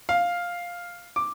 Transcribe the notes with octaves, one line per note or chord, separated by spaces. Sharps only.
F5
D6